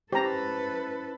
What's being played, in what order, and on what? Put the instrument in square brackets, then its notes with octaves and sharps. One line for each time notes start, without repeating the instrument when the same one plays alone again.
[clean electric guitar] C#4 E4 C5 [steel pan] G4 A#5 [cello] A4 B4